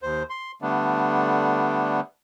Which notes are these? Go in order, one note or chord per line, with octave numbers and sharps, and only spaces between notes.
D#2 C5
C6
D3 G3 A3 B3 D4